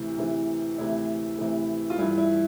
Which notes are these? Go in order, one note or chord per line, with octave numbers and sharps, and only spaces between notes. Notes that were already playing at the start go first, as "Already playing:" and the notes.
Already playing: D2 C3 E3
D2 C3 E3
D2 C3 E3 E4
D2 C3 E3
F4
G2 E3 E4
E4